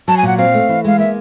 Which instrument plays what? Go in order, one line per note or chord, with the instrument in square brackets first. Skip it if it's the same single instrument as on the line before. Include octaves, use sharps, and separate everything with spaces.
[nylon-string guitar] F#3 [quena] A5
[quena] G#5
[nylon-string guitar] A#2 [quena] F#5
[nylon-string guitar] C4 [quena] F5
[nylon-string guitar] A3
E3
[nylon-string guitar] G#3 [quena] F5
[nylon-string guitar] A#3 [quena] E5